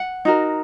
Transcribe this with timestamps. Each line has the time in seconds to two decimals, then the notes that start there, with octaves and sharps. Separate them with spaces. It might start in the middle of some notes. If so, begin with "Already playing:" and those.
Already playing: F#5
0.25 D#4 F#4 A#4